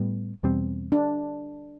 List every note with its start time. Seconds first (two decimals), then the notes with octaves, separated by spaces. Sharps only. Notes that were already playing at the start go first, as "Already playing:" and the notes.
Already playing: A2 G3 B3
0.43 E2 B2 G3 C4
0.92 D4